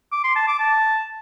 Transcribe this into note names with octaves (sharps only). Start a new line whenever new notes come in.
D6
C6
A5
D6
A5